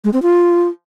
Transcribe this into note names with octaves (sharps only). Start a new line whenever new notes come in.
G#3
C4
F4